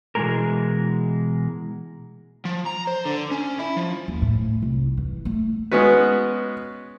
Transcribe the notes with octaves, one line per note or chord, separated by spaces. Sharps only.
B2 E3 F3 G#3 G#4 A#4
F3
A#5
C5
D3
C#4
E4
F3
D#2
A2
C2
E3
A3
G#3 B3 C#4 F#4 B4